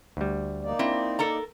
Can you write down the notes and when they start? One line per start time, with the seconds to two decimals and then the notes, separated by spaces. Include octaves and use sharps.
0.17 D2 G3
0.64 A#3 D#4 D5
0.79 C4 E4
1.19 A4 A#4 A#5